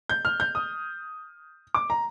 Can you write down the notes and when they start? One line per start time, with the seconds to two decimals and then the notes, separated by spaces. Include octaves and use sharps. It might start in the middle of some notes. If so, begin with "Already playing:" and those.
0.09 G6
0.25 F6
0.40 G6
0.55 D#6
1.75 D6
1.90 A#5